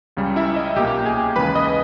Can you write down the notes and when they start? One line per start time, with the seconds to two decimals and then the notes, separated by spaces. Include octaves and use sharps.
0.17 C#2 C#3 G3
0.36 E4 E5
0.56 D#5
0.76 B1 A#2 A#3 G4 G5
1.05 G#4 G#5
1.36 D#2 C#3 E3 G#3 B4 B5
1.55 D#5 D#6